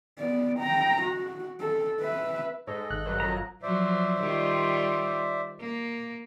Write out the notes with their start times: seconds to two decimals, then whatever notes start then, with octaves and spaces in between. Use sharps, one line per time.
0.18 B3 D5
0.59 G5 A#5
1.02 F#4
1.60 A4
2.00 B4 E5
2.67 G#2 A4 D#5
2.90 G#1 F#6
3.06 G2 F#3 G3
3.20 F#2 F3 F#3 A#5
3.63 F3 F#3 C5 D5 E5
4.20 D#3 G3 F4
5.60 A#3